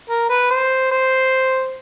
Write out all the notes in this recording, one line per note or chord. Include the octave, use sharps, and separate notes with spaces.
A#4
B4
C5
C5